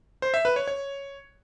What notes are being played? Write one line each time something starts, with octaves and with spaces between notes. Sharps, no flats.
C5
E5
B4
C#5
C#5